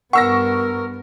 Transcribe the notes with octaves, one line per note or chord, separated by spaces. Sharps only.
G2 B3 A#4 F#5 C#6 E6 A#6